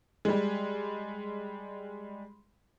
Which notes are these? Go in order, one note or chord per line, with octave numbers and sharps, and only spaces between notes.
G3 G#3